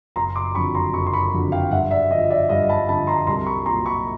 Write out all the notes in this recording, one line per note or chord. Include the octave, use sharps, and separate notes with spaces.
F#1 A#5 C6
C6 D6
F2 D3 F#3 B5 C#6
A#5 C6
F#1 B5 C#6
C6
B5 C#6
F2 D3 F#3
F5 G5
G2 E5 F#5
D5 E5
D3 F3 D#5
D5 E5
G2 D#5 F5
A5 B5
D3 F3 A5 B5
A#5 C6
C2 A#5 C6
B5 C#6
A#2 F#3 A#5 C6
B5 C#6